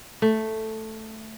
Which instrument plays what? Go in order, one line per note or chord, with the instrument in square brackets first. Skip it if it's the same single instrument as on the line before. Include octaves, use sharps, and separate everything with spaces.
[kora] A3